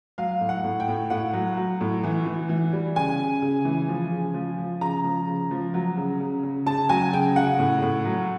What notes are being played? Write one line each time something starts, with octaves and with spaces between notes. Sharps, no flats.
F#3 F5
A2
F#5
A2
G5
A2
A2 F#5
F#3
F#3
A2
E3
E3
E3
G3
C#3 G#5
C#3
C#3
E3
F3
C#3
F3
F3
C#3 A#5
F3
C#3
F3
F#3
C#3
C#3
C#3
C#3 A5
F#3 G#5
C#3 G5
C#3 F#5
A2
A2
F#3